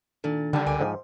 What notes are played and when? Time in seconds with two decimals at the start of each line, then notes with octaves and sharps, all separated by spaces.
0.24 A#2 D#3 D4 A4
0.53 D3 D#3 G3 C#4 G5 A5
0.66 C#2 A#4 G5 G#5 D6
0.81 G#2 F3 C5